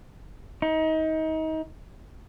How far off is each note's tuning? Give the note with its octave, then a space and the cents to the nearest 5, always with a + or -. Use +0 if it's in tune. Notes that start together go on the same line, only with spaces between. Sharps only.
D#4 +30